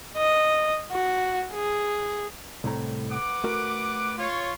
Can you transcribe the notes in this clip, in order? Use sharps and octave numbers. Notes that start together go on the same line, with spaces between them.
D#5
F#4
G#4
C2 A2 A#5
B4 F#5 D6
A3 F#4 A#4
F4 C#5